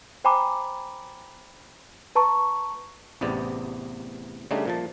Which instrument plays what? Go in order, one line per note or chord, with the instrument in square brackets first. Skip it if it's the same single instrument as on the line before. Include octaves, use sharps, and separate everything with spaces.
[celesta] C5 G5 G#5 A#5 B5 D6
B4 A5 A#5 C#6
[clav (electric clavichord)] A1 E2 C3 B3 D5
C#3 G3 A3 D4 D#4
A#2 F3 A5